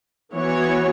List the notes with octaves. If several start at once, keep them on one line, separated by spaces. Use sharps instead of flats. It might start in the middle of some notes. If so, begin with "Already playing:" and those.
E3 B3 F#4 C#5